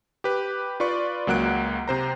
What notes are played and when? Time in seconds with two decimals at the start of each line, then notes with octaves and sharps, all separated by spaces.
0.24 G4 B4
0.80 F4 B4 D5 C#6
1.27 C#2 F#3 A#3 F#5 F#6 D7
1.88 C3 C5 A#5